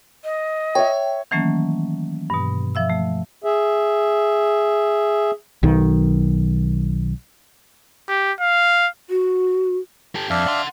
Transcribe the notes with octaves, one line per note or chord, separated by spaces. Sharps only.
D#5
C#5 E5 G5
D#3 E3 F#3 A3 A#3 C#4
G2 B2
F3 E5 E6
A3
G#4 E5
B1 D#3
G4
F5
F#4
G4 A4
F2 D4 E5 F5
F#5 C6